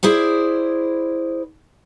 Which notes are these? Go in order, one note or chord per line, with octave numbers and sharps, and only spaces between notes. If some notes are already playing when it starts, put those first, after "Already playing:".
E4 G#4 C5 D5